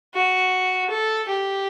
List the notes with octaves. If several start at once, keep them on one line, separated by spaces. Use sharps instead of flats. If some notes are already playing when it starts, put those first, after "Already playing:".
F#4
A4
G4